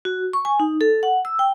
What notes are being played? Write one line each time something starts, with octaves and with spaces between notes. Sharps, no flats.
F#4
C#6
G#5
D#4
A4
F#5
E6
G5